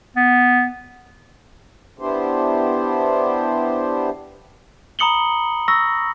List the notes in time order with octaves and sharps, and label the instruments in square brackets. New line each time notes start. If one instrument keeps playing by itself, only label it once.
[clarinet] B3
[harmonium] B3 D4 E4 G4 C5
[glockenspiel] A#5 B5 D#6 C#7 F#7 G7
C#6 E6 A#6